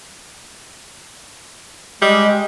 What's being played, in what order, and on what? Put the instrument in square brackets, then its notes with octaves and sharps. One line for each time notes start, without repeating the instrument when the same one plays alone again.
[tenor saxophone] G3 [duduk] G#3 [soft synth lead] D#5